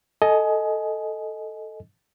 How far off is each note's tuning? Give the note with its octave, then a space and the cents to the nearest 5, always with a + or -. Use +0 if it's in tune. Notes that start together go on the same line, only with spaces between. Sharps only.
A4 +0 D#5 +5 G#5 +20